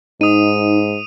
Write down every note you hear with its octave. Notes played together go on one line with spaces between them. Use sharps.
G#2 D#4 D#6 D#7